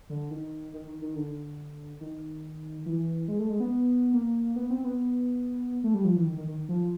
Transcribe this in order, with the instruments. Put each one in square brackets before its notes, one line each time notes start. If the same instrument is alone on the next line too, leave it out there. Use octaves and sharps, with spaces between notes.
[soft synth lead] D3
D#3
D#3
D#3
D#3
D3
D#3
E3
G#3
A3
G#3
B3
A#3
B3
C4
B3
A3
G3
F3
E3
D#3
D#3
D#3
F3